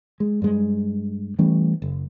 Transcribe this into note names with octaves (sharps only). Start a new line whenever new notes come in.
G#3
G2 G#3
E3 G3 A3 C#4
F#1